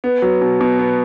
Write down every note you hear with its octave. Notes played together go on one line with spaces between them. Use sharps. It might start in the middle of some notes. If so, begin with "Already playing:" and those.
B3
F#3
B2
B2
B3